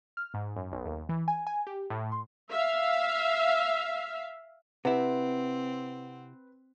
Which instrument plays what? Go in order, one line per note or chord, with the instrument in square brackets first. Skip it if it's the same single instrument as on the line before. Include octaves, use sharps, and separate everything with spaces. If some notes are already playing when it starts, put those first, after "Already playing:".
[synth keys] F6
G#2
F#2
B1
D#2
E3
G#5
G#5
G4
A2
C6
[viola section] E5 F5
[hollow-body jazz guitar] C3 E4 [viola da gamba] C4 [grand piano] B4 [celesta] F#5